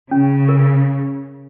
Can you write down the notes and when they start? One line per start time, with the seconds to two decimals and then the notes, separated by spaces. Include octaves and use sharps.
0.11 C#3 C#4
0.49 A#4